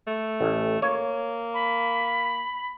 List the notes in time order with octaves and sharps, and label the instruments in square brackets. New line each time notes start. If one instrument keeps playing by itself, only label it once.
[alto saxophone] A3
[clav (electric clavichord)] A1
[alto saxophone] A#3 [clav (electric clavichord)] C#5
[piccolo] B5